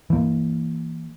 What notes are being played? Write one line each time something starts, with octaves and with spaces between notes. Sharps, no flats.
E3 A#3